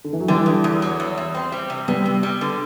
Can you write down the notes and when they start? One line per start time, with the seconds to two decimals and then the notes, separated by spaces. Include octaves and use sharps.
0.05 D3
0.13 E3
0.20 F#3
0.28 D3 E3 G3
0.46 E2
0.64 E2
0.82 F#3
1.00 E2
1.18 E2
1.35 C4
1.52 G3
1.70 C3
1.88 C3 G3 B3
2.06 C3
2.23 G3
2.41 D3